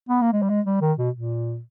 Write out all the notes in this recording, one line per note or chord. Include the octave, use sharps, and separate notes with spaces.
B3
A#3
G#3
G3
G#3
G3
D#3
B2
A#2